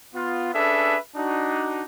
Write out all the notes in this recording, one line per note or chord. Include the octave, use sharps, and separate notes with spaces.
B3 F4
C#4 D4 G#4 A4 B4 E5
D4 D#4 F#4